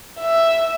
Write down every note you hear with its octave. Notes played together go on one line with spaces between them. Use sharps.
E5